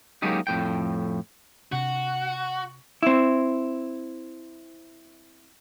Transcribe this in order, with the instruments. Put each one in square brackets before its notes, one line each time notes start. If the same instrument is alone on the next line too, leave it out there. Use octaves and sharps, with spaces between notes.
[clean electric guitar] F#3 G#3 A#3 C#4 D#4 G4
F2 A2 G5
[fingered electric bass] C3 D4 [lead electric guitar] F#4 [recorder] F#5
[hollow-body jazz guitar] C4 E4